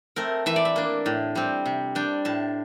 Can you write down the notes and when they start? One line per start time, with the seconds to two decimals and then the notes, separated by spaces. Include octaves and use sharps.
0.16 A3 C4 A#4
0.46 E3 E5
0.56 D5
0.65 E5
0.76 A#3 D4
1.06 A2
1.35 G3 C4
1.66 C3
1.95 G3 D4 G5
2.25 A2 A5